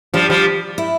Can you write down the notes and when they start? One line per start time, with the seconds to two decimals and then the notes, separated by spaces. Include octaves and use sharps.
0.14 F3 G3 D4
0.30 F3 G3
0.78 E4